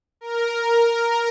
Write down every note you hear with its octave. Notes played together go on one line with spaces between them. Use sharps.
A#4